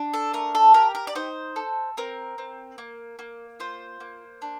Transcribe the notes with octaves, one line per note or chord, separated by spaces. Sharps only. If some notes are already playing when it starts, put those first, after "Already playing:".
Already playing: D4
A4
A3 A#4
A4
G4 A#4
A#4
D5
D#4 C5
A4
C4 A#4
C4
A#3
A#3
F4 C5
A#3
D4